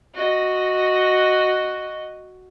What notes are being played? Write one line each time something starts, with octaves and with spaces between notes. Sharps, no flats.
F#4 D#5